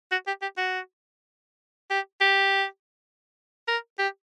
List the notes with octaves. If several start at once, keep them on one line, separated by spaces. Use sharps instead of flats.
F#4
G4
G4
F#4
G4
G4
A#4
G4